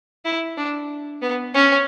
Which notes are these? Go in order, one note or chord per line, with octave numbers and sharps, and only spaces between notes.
E4
D4
B3
C#4